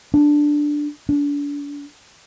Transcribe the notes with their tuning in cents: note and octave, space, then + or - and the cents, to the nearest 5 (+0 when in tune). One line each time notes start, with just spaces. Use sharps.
D4 +5
D4 -35